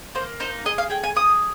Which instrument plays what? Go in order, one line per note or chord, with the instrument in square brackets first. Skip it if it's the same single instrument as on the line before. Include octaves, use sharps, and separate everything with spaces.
[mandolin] A#3 C5
D#4 C5
G#4 D#5
F5
G#4 G5
G#5
G#4 D#6